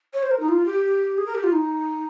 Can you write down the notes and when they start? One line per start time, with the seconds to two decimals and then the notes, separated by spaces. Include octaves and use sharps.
0.13 C#5
0.22 C5
0.31 A#4
0.39 D#4
0.48 F4
0.65 G4
1.17 G#4
1.26 A#4
1.34 G4
1.43 F4
1.52 D#4